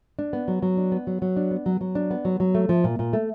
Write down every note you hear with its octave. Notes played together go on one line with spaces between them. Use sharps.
D4
B3
F#3
F#3
D4
B3
F#3
F#3
D4
B3
F#3
F#3
D4
B3
F#3
F#3
A3
F3
A#2
A#2
A3